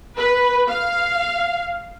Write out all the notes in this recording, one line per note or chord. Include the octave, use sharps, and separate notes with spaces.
B4
F5